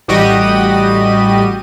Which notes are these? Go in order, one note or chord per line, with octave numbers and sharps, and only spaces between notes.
A1 G3 F#4 G4 D#5 D#7